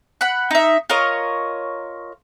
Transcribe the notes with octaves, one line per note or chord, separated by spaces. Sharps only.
F#5 B5
D#4 E5
F4 A#4 C#5 D#5